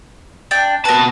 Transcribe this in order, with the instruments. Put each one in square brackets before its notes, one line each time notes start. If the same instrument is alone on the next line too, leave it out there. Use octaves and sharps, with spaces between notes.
[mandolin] D4 G5
[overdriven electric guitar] B2 A5 [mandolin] A#4 B4